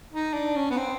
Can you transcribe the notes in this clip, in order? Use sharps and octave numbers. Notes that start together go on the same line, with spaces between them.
D#4
D4
C#4
B3
C4